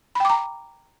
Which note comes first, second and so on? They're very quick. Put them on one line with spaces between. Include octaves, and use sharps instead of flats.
B5 G5 D6 A#5